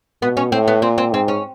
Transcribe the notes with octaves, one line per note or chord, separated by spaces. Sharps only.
B2 B3
C#4
A2 C4
B3
A#2 C4
C4
G#2 C4
C#4